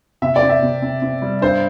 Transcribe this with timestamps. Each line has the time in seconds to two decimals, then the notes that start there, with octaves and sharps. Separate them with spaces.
0.22 C3 E5
0.36 D5
0.42 C4
0.49 E5
0.62 C3
0.82 C4
1.02 C4
1.22 G3
1.41 G2 C5